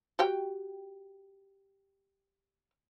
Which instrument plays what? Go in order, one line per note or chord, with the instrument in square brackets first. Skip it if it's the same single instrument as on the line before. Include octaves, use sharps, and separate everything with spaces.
[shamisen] F#4 G4 G5